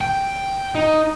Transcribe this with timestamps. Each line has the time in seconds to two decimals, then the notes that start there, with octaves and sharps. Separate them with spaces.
0.01 G5
0.75 D#4